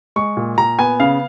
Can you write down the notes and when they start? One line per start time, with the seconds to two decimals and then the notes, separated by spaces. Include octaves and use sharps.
0.16 G#3 C#6
0.37 A#2
0.58 A#2 A#5
0.79 B3 G#5
1.00 C#3 F5